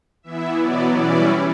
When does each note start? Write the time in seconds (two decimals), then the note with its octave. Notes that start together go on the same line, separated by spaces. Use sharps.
0.23 E3 B3 E4 E5
0.58 B2 F#3 B3 D5
0.94 E3 G3 C#4 E4 D5